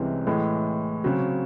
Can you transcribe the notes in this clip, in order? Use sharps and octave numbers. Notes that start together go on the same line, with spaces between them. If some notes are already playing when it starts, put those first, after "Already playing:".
Already playing: C2 C3 E3 G#3 C#4
A2 E3 G#3
C#3 F#3 C4